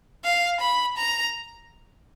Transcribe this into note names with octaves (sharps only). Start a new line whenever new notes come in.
F5
B5
A#5